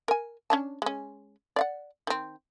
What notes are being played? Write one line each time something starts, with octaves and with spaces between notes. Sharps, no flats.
A#4 G#5
C#4 D4 A5
G#3 C#4
D5 F5 F#5
D#3 C4